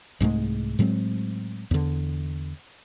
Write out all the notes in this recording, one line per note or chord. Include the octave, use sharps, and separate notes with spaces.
C2 G#2 G#3 A3
A2 F#3 G#3 C4
E2 D3